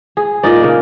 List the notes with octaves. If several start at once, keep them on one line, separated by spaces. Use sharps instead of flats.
G#4
A#2 D#4 D5
C#3 A#3